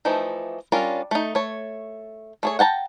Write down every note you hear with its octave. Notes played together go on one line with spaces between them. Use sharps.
E3 F3 A3 D#4
G3 C#4 D4 F4 A#4
A3 D#4
A3 C#5
A3 G#4 C#5
F#5 G5 A5 A#5